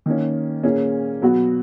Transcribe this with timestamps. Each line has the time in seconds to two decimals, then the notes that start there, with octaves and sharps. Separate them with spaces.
0.06 D#3 A#3 C#4
0.63 A#2 A#3 C#4 G#4
1.22 B2 F#3 B3 F#4